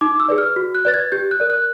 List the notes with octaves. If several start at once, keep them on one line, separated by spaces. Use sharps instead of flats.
D#4 D6
E6
G#4 B4 D5
F6
F#4
F#6
B4 D5 A6
G#6
G4 G6
F#6
A#4 D5
F#6